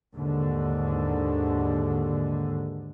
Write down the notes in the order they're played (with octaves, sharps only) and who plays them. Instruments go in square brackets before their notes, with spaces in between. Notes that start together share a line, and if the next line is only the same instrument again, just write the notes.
[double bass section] D#2 G#2 D3